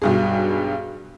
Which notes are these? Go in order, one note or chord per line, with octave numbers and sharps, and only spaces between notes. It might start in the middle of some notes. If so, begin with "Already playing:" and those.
B1 G2 G#4